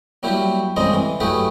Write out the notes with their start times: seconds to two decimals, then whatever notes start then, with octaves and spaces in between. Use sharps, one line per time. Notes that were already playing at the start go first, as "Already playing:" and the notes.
0.23 F#3 G3 A#3 E4 G4
0.76 A1 C#3 G3 G#3 C4 D#5
0.93 E3
1.20 F#3 A3 E4 G4 G#4 B4